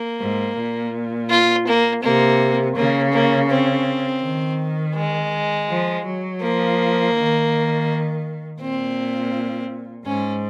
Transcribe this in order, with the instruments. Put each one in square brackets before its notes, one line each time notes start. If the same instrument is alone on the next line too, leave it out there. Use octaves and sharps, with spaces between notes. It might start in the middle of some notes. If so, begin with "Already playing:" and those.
Already playing: [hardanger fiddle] A#3
[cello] G#2
A#2
[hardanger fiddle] F4
A#3
[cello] C3 [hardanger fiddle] A#3
[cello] C#3 [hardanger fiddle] A#3
[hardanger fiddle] A#3
C4
[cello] D#3
[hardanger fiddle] G#3
[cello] F3
F#3
[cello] F3 [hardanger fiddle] A#3
[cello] D#3
[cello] A#2 [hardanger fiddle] C4
[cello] G#2 [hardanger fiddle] C#4